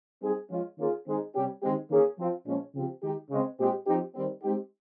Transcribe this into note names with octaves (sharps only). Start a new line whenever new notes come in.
G3 C4 D#4 G#4
F3 G#3 C#4 F4
D#3 A#3 C#4 F4 G#4
D#3 G#3 C4 D#4 G#4
C3 G3 C#4 G4
D#3 G#3 C4 G4
D#3 A#3 C#4 G#4
F3 C4 F4
A#2 F3 G#3 C#4
C#3 F3 C4 G4
D#3 G#3 D#4 G4
C#3 G#3 C4
A#2 G#3 C4 G4
F3 C4 D#4 G4
D#3 G3 C4
G#3 C4 D#4 G4